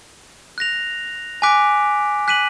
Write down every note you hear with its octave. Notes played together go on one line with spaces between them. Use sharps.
F#6 A#6 F7
G#5 D6 F#6 B6 D7
F#6 B6 D#7 F#7